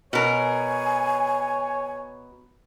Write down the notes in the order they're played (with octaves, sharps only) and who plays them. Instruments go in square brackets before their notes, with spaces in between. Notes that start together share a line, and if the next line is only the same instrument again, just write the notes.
[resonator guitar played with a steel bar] B2 A#4 [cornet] C#5 [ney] G#5